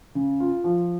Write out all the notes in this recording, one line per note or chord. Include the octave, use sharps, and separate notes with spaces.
C#3
F4
F3